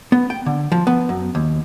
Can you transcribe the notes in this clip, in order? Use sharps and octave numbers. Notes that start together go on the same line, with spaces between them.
B3
G5
D3
F3
B3
F#2
D#2